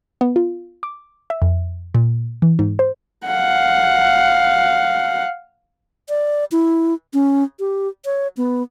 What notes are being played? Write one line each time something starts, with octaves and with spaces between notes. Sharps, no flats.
B3
F4
D6
E5
F2
A#2
E3
G#2
C5
F5 F#5
D5
E4
C#4
G4
C#5
B3